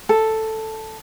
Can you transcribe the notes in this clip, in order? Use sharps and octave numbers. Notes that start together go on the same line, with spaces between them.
A4